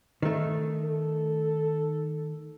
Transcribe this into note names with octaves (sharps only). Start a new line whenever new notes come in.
D#3 A3
A4